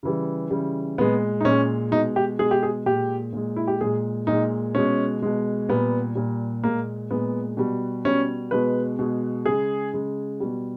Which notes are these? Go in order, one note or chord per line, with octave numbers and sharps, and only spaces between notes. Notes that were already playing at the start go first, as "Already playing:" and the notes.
C#3 E3 G3
C#3 E3 G3
A#2 G#3 B3
D#4
A#2 G#3 C#4
B2 G#3 D#4
G4
B2 G#3 G#4
G4
G#4
A#2 G#3 G4
A#2 G#3
E4
G4
A#2 G#3 G#4
A#2 G#3 D#4
B2 G#3 C#4
B2 G#3
A#2 G3 B3
A#2 G3
A#2 G#3 A#3
A#2 G#3 B3
B2 G3
B2 G3 C#4
B2 G#3 B4
B2 G#3
C#3 G#3 G#4
C#3 G#3
B2 G3